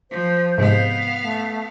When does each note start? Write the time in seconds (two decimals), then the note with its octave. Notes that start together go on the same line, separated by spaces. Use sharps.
0.11 F3 C5
0.58 G#2 C3 G#3 B3 F5
1.21 A3